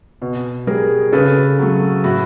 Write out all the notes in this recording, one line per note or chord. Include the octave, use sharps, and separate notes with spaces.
B2
G3 G#4 A#4
C#3 A4 B4
F#3 A3
A2 E4 F#4